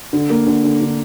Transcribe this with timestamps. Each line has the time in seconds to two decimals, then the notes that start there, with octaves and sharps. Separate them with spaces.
0.13 D3
0.30 A#3
0.47 D3
0.64 D3
0.81 D3